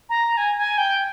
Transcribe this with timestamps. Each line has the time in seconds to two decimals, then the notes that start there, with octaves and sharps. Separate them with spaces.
0.09 A#5
0.37 G#5
0.58 G#5
0.78 G5